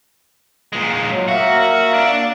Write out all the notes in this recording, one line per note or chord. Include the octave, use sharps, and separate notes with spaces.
A#2 G#3
F#3
A#3 F#4 E5 F5
D4 D5